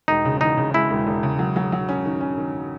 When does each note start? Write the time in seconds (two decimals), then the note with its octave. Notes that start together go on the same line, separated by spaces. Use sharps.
0.08 E1 D#4
0.25 C#3
0.41 E2 D#4
0.57 C#3
0.74 G#3 E4
0.90 E1
1.07 E1
1.23 C#3
1.39 F#3
1.56 F#3
1.72 F#3
1.88 C#4
2.05 D#3
2.21 C#4
2.38 D#3